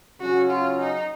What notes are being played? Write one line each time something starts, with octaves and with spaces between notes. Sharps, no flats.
C#3 F#3 C#4 F#4
F4
D#4